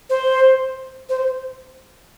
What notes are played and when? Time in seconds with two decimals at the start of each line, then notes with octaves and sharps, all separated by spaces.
0.09 C5
1.09 C5